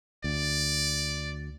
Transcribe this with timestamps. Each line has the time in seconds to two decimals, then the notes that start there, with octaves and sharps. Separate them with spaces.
0.24 D2 D5